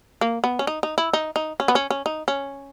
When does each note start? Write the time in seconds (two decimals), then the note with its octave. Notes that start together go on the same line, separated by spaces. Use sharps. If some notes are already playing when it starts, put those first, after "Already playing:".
0.21 A#3
0.44 B3
0.59 C#4
0.67 D#4
0.83 D#4
0.98 E4
1.13 D#4
1.36 D#4
1.60 C#4
1.68 B3
1.75 C#4
1.90 C#4
2.06 D#4
2.28 C#4